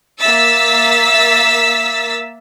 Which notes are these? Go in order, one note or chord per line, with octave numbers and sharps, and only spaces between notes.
A#3 E5 E6 A6 B6